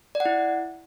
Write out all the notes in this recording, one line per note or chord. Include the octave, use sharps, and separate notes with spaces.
D5
F#5
E4